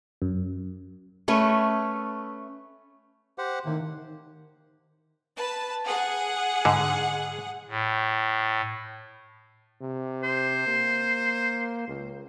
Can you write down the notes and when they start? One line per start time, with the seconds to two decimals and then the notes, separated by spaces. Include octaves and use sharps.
0.22 F#2
1.28 A3 C#4 B4
3.38 G4 C5 F#5
3.65 A2 C3 D#3 A#3
5.37 B4 A5
5.86 G#4 F#5
6.65 G#2 D3
7.68 A2
9.81 C3
10.23 C5
10.67 A#3
11.88 C#2